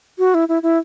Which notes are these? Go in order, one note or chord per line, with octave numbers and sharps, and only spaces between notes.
F#4
E4
E4
E4